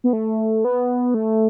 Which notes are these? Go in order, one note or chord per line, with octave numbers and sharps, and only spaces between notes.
B3
A3
B3
A3